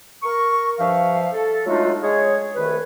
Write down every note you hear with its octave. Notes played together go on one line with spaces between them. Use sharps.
A#4 C#6
G2 F3 E5 F5
A4
F#3 G#3 A3 D4 D#4 F4
G#3 G#4 C#5
C2 D#3 A3 B4